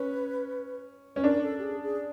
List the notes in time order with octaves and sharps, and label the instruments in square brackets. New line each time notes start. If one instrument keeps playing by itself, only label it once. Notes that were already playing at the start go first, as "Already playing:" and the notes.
Already playing: [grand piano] C#4 [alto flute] B4
[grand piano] C#4 [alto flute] B4
[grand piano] D4 [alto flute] A#4
[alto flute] A4
G4
G#4
G#4